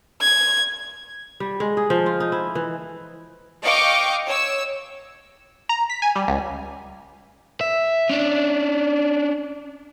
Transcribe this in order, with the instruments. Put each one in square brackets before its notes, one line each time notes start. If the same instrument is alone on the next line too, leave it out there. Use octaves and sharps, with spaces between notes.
[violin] G#6
[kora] G3
G#3
G#4
F3
F4
D#4
E4
E3
[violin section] D#5 F5 G5 C#6 D6
C#5 E6
[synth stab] A#5
B6
G#5
G3
C#2
[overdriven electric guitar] E5
C#4 D4